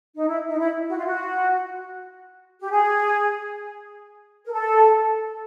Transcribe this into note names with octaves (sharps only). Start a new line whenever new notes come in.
D#4
E4
D#4
E4
F#4
F4
F#4
G4
G#4
A#4
A4